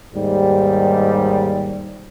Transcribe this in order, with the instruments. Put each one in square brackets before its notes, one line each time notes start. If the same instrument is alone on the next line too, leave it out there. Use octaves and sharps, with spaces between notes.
[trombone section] D#2 G#2 G3